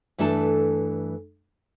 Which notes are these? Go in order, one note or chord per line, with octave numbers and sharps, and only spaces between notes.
G2 E3 A3 D4 A4 A5